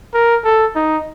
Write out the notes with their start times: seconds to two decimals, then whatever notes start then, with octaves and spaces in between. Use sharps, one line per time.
0.14 A#4
0.44 A4
0.76 D#4